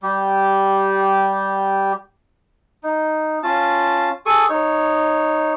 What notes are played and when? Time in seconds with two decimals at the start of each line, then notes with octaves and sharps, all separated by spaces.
0.03 G3 G4
2.83 D#4
3.43 C#4 F4 A5
4.26 G#4 A4 C#6 D#6
4.49 D#4 C#5